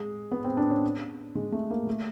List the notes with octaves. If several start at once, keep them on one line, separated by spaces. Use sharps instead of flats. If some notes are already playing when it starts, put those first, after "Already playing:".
Already playing: G#3
B3
C4
D4
C#4
G#3
A3
A#3
A3